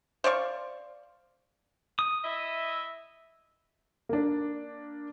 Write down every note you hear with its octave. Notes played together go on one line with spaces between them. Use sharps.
C5 D5 F5 C#6
D#6
E4 D#5 E5
A#3 D4